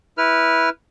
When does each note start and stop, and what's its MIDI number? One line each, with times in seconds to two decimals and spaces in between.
0.18 0.69 64
0.18 0.69 71
0.18 0.69 89